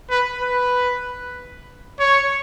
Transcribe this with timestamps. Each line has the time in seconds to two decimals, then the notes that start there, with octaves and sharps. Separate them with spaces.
0.10 B4
0.42 B4
2.00 C#5